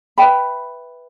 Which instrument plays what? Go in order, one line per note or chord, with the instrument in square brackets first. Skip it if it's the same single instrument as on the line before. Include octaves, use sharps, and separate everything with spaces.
[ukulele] B4 E5 G5 B5